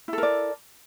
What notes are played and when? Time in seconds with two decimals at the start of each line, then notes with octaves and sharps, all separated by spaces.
0.08 E4
0.13 A4
0.18 A#4
0.23 D5